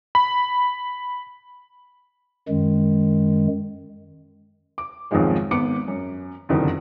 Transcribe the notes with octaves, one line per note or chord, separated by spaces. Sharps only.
B5
F#2 D#3 G#3
D6
B1 F2 G#2 D#3 F3 G#3
G#1 B3 D6 C#7
F#2
F#1 C2 F2 D3 D#3